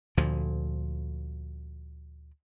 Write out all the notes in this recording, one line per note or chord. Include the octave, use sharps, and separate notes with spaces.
D2 A#2 F3